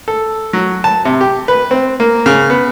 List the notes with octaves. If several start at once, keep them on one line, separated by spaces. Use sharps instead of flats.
A4
F#3
A5
C3
G4
B4
C4
A#3
C#3
B3